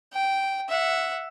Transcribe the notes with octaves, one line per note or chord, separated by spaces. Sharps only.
G5
E5 F#5